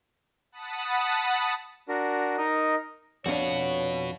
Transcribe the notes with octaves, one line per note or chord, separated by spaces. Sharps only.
F#5 A5 B5 D#6
D4 F#4 A#4
D#4 A#4 D#5
F2 D4 F#4 B4 C#5